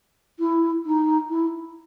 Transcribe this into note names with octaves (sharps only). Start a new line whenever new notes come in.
E4
D#4
E4